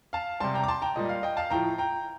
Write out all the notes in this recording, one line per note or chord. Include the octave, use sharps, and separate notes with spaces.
F5 A5
C3 G3 A5 C6
G5 A#5
D6
A5 C6
G5 A#5
A#2 G3 D#5
F5
D#5 G5
F5 A5
A2 F3 G5 A#5
G5 A#5